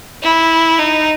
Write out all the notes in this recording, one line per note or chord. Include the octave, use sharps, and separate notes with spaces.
E4
D#4